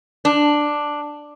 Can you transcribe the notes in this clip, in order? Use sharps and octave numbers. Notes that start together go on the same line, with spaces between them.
D4